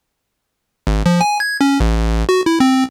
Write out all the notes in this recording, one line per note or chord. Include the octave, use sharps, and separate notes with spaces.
G#1
F3
G#5
G#6
C#4
A1
F#4
E4
C4